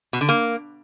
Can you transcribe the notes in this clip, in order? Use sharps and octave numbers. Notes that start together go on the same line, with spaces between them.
B2
D3
A#3